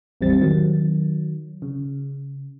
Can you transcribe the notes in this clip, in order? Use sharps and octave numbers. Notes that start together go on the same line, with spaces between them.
A1 E2 G3 C4 A6
D#3 F#3
C#3